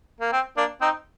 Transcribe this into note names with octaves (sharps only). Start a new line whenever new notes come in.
A#3
C4
A#3 D4
C4 D#4